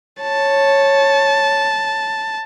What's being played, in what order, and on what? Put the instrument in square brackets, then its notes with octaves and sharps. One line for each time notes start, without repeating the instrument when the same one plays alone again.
[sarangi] C#5 [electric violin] A5